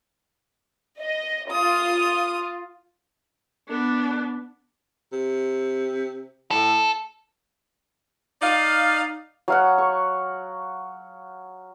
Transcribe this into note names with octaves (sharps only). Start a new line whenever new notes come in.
D#5
F4 D#6
B3 D4
C3
A2 A4
D#4 D5 F5
F#3 F5 F#5
C#6